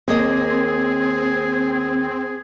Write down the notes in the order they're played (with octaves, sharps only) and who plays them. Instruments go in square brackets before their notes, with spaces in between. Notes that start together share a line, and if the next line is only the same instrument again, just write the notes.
[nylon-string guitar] D#2 A#3 D#5 [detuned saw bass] C4 [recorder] G#4